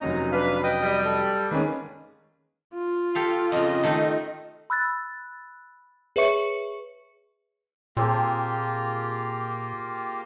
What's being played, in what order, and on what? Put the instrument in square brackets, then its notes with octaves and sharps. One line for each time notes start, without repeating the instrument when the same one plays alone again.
[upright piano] F1 F#3 C#4 [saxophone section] D#3 F3 D#4 [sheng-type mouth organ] A#5
[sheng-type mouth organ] D4 F5 [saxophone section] B4
[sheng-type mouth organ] D#5 G5 D#6
[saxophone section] G3
[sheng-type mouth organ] A4
[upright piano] D#3 G#3 C#4 [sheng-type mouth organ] A#3 B4
[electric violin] F4
[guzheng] G4 A4 F5
[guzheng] F2 C#3 [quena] D#5
[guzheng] D#3 A3 D#4
[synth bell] B5 E6 F#6 A6
G#4 B4 C#5 E5 C#6 C#7
[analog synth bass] A#2 [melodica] A#3 F4 G4 [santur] C4 G#4 A5